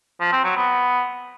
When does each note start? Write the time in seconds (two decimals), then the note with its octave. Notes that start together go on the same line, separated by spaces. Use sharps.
0.20 F3
0.32 C4
0.44 F#3
0.56 B3